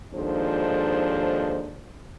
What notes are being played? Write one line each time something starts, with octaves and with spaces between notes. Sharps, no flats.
D#2 G#2 F3 D4 A4 C5